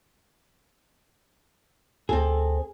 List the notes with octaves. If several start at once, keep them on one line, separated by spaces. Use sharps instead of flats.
D2 C4 G#4 A4